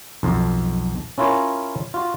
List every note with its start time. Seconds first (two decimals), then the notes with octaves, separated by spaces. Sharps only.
0.23 B1 F2
1.18 C#4 E4 F4 A#4 C#5
1.94 F4 F#4